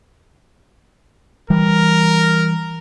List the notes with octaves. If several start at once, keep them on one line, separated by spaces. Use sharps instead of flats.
E3 G3 A#4